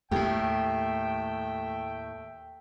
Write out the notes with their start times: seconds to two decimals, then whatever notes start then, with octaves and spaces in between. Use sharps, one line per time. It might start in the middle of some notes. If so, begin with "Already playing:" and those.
0.11 D#2 A2 A3 G4 A4 E5 G5